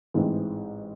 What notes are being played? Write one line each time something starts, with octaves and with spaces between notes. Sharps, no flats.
A1 G#2 E3 G#3 C4